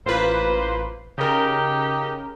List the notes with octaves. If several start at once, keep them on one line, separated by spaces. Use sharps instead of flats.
A1 A#3 F4 B4 C5
C#3 D#4 G4 A#4